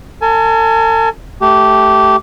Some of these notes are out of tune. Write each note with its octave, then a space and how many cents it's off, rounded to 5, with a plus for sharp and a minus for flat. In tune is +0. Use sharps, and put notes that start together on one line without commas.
A4 +45 G#5 +35
A3 -10 G4 -15